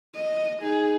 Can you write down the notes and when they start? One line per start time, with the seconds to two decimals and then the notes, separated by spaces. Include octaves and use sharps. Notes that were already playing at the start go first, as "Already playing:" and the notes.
0.15 D#5
0.61 D#4 G#4